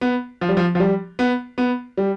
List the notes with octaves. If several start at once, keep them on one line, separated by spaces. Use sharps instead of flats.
B3
F3
G3
F3
F3
G3
B3
B3
G3